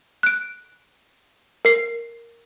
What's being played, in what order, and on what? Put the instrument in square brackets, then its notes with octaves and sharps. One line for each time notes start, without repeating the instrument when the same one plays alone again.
[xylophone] F#6 D7
A#4 C7